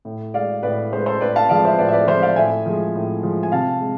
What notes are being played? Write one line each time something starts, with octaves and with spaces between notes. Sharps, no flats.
A2
G#3 D5 F5
A2 B4 D5
G#3 C5
B4
A4 C5
A2 B4 D5
F5 A5
F3 G#3 D5 F5
C5 E5
A2 B4 D5
E5
B4 D5
F3 G#3 C5 E5
D5 F5
A2 E5 G#5
F3 G#3
A2
F3 G#3
G#5
C3 F5 A5
G#3